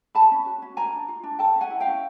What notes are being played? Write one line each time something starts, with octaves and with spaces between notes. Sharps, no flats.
A#4 A5 B5
C#4
F#4
C#4
A#4 G#5 A#5
D4
F4
D4
A4 G5 A5
C#4
F#5 G#5
E4
F5 G5
C#4